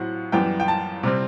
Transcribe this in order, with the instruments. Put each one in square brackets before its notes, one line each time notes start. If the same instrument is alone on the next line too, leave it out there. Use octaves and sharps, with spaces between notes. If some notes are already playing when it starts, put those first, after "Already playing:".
Already playing: [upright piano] A2 F#3 C4 F#5
F#2 E3 G3 B3 G5
G5
A5
C3 G3 C4